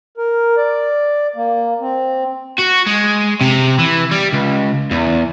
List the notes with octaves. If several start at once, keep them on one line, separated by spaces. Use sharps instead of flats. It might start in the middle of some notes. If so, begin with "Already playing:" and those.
A#4
D5
A#3
C4
F#4
G#3
C3
E3
G3
C#2
E2